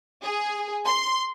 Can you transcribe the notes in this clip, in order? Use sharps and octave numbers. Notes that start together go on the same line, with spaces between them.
G#4
C6